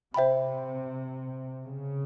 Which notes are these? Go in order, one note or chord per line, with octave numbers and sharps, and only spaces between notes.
C3 C5 E5 G5 B5
C#3